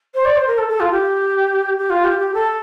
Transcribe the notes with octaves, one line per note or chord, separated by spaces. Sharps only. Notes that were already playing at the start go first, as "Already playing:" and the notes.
C5
D5
C5
A#4
A4
A4
F4
G4
G4
F4
G4
G4
A4